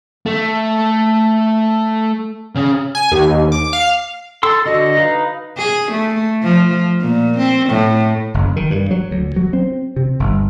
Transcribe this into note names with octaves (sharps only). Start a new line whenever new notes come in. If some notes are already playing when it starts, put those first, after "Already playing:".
A3
C#3 C#4
G#5
D#2
D6
F5
A4 C6 E6
D3 F#4 D#5
D#4 B4 F5
G#4
A3
F3
A#2
C4
A2
F#1
D#3
G2
F#3
D2
F#3
C4
C3
G1